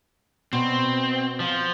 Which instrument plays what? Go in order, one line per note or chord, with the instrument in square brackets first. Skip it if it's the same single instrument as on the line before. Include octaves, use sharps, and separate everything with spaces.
[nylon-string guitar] B2 [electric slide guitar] C4
[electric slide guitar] F3